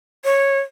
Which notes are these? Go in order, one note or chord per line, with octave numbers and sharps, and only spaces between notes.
C#5